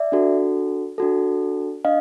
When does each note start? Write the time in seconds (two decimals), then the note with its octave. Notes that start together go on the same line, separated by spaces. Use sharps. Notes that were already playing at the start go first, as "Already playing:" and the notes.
Already playing: D5 E5
0.12 D4 F#4 A4
0.98 D4 F#4 A4
1.85 D4 D#5 F5